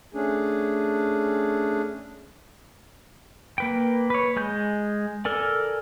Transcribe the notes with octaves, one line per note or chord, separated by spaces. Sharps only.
A3 C#4 D4 G#4
A#3 B4 G5
B4 C#5
G#3 G#5 G6
A4 A#4 D5 G#5